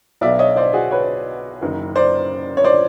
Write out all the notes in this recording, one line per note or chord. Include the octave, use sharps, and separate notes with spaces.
B1 B2 D5 E5
C#5 D#5
C5 D5
F#4 G#4
B4 C#5
F#1 F#2 D#3
C5 D5
C#5
C5 D5